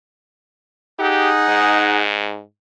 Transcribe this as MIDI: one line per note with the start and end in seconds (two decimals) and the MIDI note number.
0.99 2.03 63
0.99 1.30 67
0.99 2.03 68
0.99 2.03 78
1.49 2.42 44